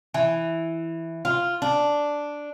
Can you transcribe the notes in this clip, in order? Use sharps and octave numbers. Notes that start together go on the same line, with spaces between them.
E3
F4
D4